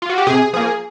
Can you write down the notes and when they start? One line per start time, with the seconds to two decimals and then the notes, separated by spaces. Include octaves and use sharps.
0.02 F4
0.09 F#4
0.18 G4
0.27 C3 G#4
0.53 F3 A#3 G#4